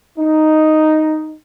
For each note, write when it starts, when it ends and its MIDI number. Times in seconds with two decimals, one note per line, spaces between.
0.18 1.31 63